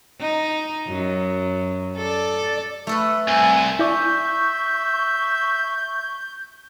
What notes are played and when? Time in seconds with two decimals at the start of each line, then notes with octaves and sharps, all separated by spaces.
0.20 D#4
0.87 F#2
1.97 A4 D5
2.87 A3 A4 B4
3.28 C2 G#5
3.79 E4 D5 E5 C#6 G6